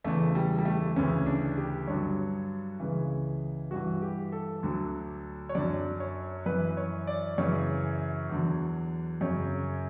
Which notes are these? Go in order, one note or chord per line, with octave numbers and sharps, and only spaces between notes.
E2 C#3 E3 A3
G3
G3
A3
D2 C#3 E3 C#4
D4
G4
G2 D3 F#3 C#5
C#2 C#3 E3
G2 E3 F#4
G4
A4
D2 D3 F#3
C#5
F#2 D3 F#3 D5
C#5
F#2 E3 B4
C#5
D5
F#2 C#3 E3 C#5
E2 D3 F#3
F#2 C#3 F#3 C#5